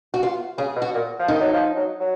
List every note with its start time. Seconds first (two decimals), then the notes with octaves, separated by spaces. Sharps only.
0.14 F#4
0.23 F4
0.58 C#3 G#4
0.76 B2
0.82 F#4
0.94 A#2
1.19 F3
1.28 D#3 D#4
1.41 F#3
1.53 F3
1.76 F#3
2.00 F#3